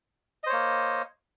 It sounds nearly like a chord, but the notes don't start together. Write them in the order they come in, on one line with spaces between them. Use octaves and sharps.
D#5 C5 C#5 A#3